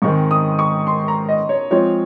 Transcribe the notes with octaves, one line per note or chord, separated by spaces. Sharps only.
G#2 D#3 G#3 C4 C#6
D#6
C#6
C6
A#5
D#5
C#5
F3 G#3 C4 F4 C#5